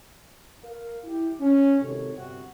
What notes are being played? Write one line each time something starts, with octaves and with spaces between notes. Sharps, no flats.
A#4 F5
E4 G4
C#4
G#1 C3 D#3 A4 C#5
G1 C3 F#4